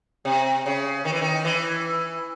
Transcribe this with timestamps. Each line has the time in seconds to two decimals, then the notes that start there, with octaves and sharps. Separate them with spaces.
0.25 C3
0.66 C#3
1.05 D#3
1.13 E3
1.21 D#3
1.45 E3